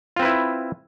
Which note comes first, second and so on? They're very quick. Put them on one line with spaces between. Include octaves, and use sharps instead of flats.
F4 C4 B4 E4